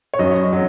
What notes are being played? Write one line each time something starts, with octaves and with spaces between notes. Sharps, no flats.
C#5
F#2 D#5
F#3